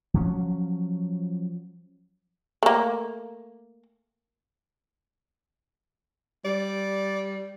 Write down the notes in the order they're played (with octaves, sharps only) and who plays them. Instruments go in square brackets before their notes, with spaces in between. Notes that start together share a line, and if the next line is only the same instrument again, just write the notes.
[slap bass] F3 F#3 C#4
[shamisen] A3 A#3
[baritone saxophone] G3 [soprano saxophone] D5